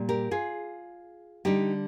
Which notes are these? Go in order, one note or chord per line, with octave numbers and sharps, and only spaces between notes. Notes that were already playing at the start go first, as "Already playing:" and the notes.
Already playing: A#2 G3
G4 A#4
F4 G#4
D3 G3 D#4 G4